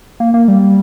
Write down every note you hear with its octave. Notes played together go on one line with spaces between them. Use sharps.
A#3
A#3
G3